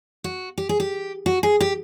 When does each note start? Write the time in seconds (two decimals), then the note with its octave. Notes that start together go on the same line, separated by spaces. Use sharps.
0.24 F#4
0.58 G4
0.69 G#4
0.80 G4
1.26 F#4
1.43 G#4
1.60 G4